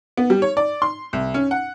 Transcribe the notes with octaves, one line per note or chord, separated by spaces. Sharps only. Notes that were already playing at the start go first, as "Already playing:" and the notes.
B3
G3
C#5
D5
C6
C2
C#4
F#5